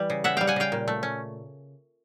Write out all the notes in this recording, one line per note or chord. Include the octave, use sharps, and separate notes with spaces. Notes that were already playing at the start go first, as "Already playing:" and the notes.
Already playing: E3 G3
C#3
C#3 E5 F#5
G3 F5 G5
F#5 G#5
C#3 F5 G5
A#2
A3
C#4